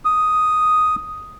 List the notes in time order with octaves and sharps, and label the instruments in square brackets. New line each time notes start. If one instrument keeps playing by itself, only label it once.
[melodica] D#6